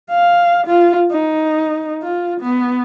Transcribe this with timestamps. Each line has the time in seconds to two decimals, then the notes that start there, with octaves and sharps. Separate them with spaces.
0.10 F5
0.67 F4
1.12 D#4
2.02 F4
2.40 B3